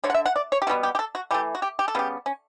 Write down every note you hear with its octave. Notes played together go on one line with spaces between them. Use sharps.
D3 A3 C#5
F#5
E5
F#5
D5
C#5
G4
B2 G3 B3 F#4
G4
G4
A4
F#4
E3 A3 G4
F#4
G4
G4
A4
C#3 G3 B3 G4
C#4